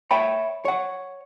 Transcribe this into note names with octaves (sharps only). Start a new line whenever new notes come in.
C#5 E5 G5 B5
C#5 F#5